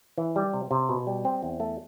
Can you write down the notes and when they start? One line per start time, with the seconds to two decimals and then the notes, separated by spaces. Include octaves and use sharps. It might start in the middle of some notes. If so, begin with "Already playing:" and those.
0.18 E3
0.36 G3
0.54 C3
0.71 C3
0.89 B2
1.07 G3
1.25 C4
1.43 E2
1.60 A3